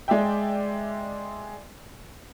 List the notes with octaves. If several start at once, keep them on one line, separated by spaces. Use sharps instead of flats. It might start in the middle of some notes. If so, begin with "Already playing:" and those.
G#3 D5 E5 G5